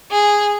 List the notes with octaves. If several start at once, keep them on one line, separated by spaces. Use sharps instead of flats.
G#4